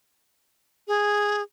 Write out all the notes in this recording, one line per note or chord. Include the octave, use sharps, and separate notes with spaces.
G#4